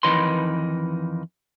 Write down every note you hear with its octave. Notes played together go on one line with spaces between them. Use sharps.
F2 D#3 E3 D#4 B4 C6